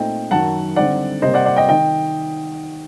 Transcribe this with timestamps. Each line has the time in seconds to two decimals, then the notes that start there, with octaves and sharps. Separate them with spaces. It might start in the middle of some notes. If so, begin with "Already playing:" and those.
Already playing: A#2 A3 C4 D#4 D#5 G5
0.31 F#2 D#3 F#3 F#5 A5
0.76 D3 G3 C4 D#4 D5 F#5
1.22 C3 G3 A#3 C5 D#5
1.34 D5 F#5
1.45 D5 F#5
1.56 D#5 G5
1.69 D#3 D#5 G5